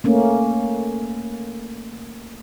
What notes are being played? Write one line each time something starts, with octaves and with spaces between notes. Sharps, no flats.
A3 A#3 C#4